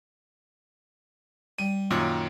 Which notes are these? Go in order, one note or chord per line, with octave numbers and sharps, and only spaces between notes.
G3 D#7
F#2 A#2 D#3 C#5